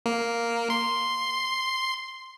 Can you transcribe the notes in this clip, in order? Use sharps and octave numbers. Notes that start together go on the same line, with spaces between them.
A#3
C6